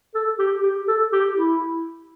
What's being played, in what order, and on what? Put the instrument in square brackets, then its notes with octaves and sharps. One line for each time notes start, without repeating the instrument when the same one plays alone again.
[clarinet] A4
G4
G4
A4
G4
E4